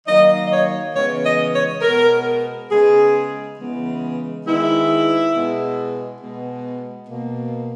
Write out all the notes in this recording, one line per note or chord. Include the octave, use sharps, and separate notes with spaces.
D#3 F#3 A#3 D#5
D#5
C#5
C#3 E3 G#3 B3 C#5
D#5
C#5
B2 G#3 B3 A#4
C#3 G#3 B3 G#4
C#3 E3 G#3 B3
D#3 G#3 B3 E4
B2 G#3 B3
B2 G#3 B3
B2 A#3